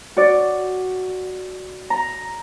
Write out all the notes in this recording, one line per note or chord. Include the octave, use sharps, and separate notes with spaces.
F#4 D5
A#5